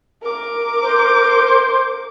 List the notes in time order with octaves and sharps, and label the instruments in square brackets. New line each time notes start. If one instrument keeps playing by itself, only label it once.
[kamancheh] A#4 D6
[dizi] C5